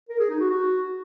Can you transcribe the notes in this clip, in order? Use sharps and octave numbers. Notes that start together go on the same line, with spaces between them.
A#4
G#4
D#4
F#4
F#4